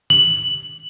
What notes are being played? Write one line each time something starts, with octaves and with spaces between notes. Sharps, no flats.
F#7